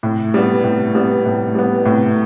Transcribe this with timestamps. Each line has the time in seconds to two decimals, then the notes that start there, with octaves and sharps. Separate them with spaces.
0.03 A2
0.34 G3 B3
0.64 A2
0.95 G3 B3
1.26 A2
1.55 G3 B3
1.85 A2